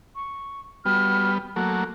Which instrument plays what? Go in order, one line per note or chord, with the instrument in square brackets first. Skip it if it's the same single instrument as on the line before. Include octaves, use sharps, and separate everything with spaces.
[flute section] C#6
[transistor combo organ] G3 B3 [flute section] F#4 F6
[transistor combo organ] F#3 A3 A#3 [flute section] F#6